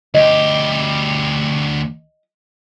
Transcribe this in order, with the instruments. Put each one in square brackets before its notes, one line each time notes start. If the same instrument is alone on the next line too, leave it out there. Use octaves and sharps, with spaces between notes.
[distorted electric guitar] D2 G4 [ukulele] D#5